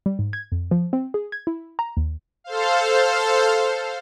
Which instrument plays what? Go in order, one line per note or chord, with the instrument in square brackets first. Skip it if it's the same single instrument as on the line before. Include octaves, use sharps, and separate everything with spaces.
[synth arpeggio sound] G3
G#2
G#6
F2
F3
C4
G#4
G#6
E4
A#5
D#2
[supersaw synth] A4 C5 F5